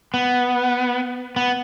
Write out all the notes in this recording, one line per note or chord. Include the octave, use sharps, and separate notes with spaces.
B3
B3